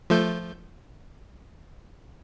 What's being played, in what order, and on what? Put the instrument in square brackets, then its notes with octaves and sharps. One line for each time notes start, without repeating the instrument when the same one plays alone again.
[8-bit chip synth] F3 A3 G6